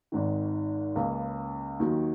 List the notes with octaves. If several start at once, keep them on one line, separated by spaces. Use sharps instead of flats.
G#1 G#2 D#3
C#2 C#3 A#3
D#2 D#3 F#3